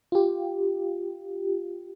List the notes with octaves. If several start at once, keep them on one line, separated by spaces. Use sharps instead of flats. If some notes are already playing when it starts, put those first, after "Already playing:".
F4 G4